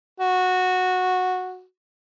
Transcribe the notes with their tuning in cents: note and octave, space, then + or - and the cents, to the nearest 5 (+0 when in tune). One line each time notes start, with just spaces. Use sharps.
F#4 -10